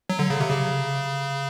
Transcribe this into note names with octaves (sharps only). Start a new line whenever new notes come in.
F#3
D3
C#3
C3
C#3